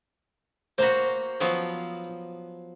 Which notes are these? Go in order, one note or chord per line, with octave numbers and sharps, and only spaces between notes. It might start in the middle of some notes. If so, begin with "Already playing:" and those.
A#3 F#4 C5 A#5 B5
F3 F#3 B3